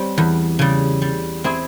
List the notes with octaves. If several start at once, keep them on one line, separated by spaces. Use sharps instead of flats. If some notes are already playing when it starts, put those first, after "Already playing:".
Already playing: G3 C4 G4 C#5
E2
C#3 G3
G3
C4 E4 G#4